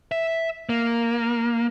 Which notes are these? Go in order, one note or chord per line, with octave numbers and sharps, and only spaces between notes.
E5
A#3